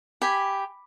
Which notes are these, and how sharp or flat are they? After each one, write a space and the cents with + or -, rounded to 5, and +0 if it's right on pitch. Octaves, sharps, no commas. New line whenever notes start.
G4 +0 G#5 +0 B5 +0